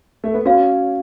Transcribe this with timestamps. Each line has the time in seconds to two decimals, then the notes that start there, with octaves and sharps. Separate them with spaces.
0.24 A3
0.34 B3
0.45 C#4 F#4 C#5 F5